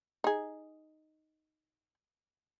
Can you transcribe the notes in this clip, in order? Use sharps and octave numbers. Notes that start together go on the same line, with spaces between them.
D#4 G#4